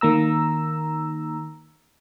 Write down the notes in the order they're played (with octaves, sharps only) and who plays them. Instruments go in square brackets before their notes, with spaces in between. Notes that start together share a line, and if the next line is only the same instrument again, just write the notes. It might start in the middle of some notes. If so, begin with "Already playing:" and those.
[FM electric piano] D#3 A#3 A#5 E6